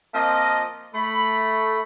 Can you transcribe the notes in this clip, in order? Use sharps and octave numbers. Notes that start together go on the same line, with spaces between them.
F3 A#3 C4 F4 D#5
A3 B5